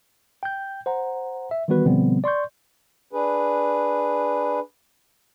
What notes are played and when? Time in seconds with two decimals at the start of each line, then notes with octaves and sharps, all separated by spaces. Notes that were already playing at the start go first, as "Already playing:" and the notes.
0.43 G5 G6
0.86 C5 F#5 A#5
1.51 E5
1.68 D#3 E3 G3 B3 F#4 B4
1.85 B2 D3 F3 G3 B3 C4
2.24 D5 C6 C#6 G6
3.13 D4 G#4 B4